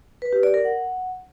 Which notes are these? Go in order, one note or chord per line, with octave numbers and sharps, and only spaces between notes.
B4
G4
D5
A#4
F#5